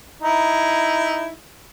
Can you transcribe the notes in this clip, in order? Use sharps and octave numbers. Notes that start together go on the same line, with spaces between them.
D#4 E4